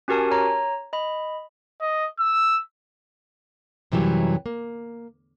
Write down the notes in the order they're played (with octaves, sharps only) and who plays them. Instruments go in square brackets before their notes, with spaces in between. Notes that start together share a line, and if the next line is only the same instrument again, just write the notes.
[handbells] C#4 F#4 G4 A#4 G#5 A5
C#5 A#5
D#5 B5
[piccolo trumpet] D#5
E6
[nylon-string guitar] F#2 C3 E3 F#3 G3
A#3